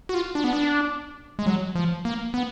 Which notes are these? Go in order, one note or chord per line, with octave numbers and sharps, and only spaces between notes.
F#4
F4
D4
B3
D4
G#3
F#3
F3
A#3
B3